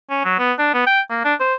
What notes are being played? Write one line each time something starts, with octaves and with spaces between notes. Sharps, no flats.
C#4
F#3
B3
D4
B3
G5
A#3
D4
C5